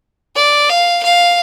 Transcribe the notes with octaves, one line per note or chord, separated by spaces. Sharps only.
D5
F5
F5